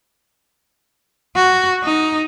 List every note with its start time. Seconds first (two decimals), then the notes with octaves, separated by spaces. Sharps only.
1.36 F#4
1.84 D#4